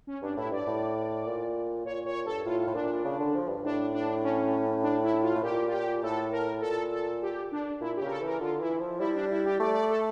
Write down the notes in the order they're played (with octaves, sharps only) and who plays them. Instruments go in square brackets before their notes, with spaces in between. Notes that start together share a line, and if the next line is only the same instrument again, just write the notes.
[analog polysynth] C#4
[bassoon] G2 [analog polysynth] D4
[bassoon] A2 [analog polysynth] E4
[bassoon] G2 [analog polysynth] D5
[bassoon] A2
A#2
[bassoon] A#2 [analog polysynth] C#5
[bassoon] A#2 [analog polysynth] C#5
[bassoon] G2 [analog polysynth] A4
[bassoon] A2 [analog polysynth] F4
[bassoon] A2
[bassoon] A#2 [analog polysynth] D4
[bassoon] C#3
D3
F3
G2
[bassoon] A2 [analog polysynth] D4
[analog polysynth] D4
C#4
D4
E4
F4
[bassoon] A2
[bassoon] A#2 [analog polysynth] G4
[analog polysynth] F4
G4
[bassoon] A2 [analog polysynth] A4
[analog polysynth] A#4
[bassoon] A#2 [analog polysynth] A4
[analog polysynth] A4
G4
D4
[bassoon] A#2 [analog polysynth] E4
[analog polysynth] G4
[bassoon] C#3 [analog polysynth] A#4
[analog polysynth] A4
[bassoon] E3
[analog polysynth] A#4
[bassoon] D3 [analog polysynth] F4
[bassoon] E3 [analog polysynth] E4
[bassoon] F3
[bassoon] G3 [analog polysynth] E4
[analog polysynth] D4
E4
G4
[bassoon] A3 [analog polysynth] D5
[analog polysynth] D5
A4